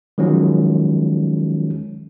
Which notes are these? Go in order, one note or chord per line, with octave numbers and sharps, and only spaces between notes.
D#3 F3 F#3 G#3 C#4